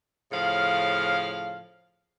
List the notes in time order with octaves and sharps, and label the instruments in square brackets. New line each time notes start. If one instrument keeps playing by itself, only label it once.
[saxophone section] A2 C#3 F3 F5